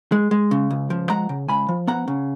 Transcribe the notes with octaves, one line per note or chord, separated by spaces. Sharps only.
G#3
G#3
C#3
C#2
F3
G#3 F#5 A#5
C#3
C#2 G#5 B5
F3
B3 F#5 A#5
C#3